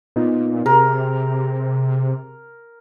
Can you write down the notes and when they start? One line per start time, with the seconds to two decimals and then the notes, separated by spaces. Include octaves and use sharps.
0.16 A#2 B3 D#4 F4
0.66 C3 G4 G#4 A#4